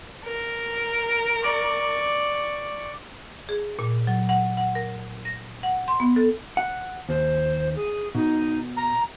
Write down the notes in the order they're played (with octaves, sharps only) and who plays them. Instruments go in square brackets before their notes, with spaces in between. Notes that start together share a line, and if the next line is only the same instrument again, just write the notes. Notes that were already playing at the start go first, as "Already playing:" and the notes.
[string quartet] A#4
[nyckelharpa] D5 C#6
[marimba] G#4
A#2
F#3
F#5
F#5
A#4
A#6
F#5
C6
B3
A4
[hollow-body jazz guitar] F#5
[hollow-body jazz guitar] D#2 [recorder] C5
[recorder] G#4
[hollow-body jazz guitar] B2 [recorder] D#4
[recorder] A#5